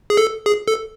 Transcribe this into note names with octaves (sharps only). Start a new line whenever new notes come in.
G#4
A4
G#4
A4